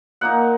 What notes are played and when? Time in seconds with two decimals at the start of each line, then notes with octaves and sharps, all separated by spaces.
0.21 A#2 A#3 D#4 F#5